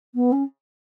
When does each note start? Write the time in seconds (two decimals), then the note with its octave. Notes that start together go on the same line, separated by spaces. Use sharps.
0.15 B3
0.32 C#4